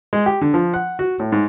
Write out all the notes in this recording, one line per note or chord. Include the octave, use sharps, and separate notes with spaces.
G#3
G4
D3
F3
F#5
F#4
A2
G#2